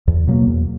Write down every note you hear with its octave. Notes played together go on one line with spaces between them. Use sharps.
E2
B2 F#3 A#3
E2